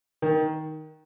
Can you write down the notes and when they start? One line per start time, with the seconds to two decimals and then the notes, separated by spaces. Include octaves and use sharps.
0.22 D#3